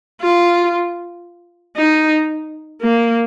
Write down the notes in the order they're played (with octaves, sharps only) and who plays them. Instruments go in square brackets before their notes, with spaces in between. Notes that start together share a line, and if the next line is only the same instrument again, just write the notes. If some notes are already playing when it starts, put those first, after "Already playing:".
[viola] F4
D#4
A#3